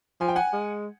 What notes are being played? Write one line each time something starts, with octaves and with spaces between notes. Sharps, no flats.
F3 G#5
G5
F#5 G#5
G#3